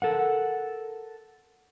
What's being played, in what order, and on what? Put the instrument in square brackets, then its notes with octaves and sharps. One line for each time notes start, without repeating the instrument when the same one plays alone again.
[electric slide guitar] A4 A#4 F#5